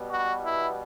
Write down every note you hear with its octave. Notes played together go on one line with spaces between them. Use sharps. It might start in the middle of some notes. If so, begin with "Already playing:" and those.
Already playing: B2 G3 B3
F#4
E4